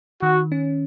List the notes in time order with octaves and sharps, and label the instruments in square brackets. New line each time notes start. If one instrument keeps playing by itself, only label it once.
[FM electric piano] D#3 [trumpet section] F#4
[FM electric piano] C#4